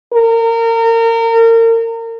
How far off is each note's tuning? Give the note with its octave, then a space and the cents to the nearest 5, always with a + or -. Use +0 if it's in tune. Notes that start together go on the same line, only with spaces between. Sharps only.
A#4 -30